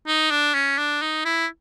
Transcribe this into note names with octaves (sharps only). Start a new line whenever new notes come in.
D#4
D4
C#4
D4
D#4
E4